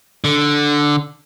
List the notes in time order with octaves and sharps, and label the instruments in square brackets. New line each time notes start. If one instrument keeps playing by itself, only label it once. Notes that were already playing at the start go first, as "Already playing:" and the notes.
[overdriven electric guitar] D3